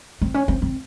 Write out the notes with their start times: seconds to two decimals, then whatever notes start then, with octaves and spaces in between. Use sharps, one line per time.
0.22 C4
0.34 C#4
0.48 C4
0.62 C4